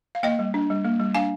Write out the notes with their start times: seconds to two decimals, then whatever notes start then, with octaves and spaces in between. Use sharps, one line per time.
0.15 F5
0.23 A#3 D#5 G5
0.39 G3
0.54 D4
0.70 G3
0.84 A#3
1.00 G3
1.15 D4 F5 G#5